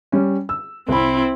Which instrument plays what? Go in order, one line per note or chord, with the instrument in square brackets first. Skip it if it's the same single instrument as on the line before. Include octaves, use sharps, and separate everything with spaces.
[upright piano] G3 C#4
E6
[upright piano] C2 B5 [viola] C4 E4